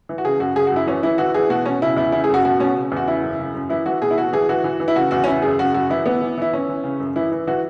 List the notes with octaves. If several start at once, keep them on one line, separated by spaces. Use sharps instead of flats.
E3
F#4
C#3 G#4
F#2 F#4
C#3 G#4
F#4
F#2 E4
E3 C#4
E3 E4
E3 F#4
E3 G#4
B2 F#4
B2 C#4
C#3 E4
E2 E4
C#3 E4
G#4
F#2 F#4
B2 F#4
B2 C#4
C#3
E2 F#4
C#3 E4
F#2
C#3
F#2
E3 E4
E3 F#4
B2 G#4
E4
B2 F#4
E3 G#4
E3 F#4
E3
E3
E4
C#3 F#4
E2 F#4
C#4
C#3 E4
F#2 G#4
C#3 F#4
F#2 F#4
E3 E4
E3 B3
E3
E3 E4
E3 C#4
E3
C#3
F#2
E3 E4
E3
E3 F#4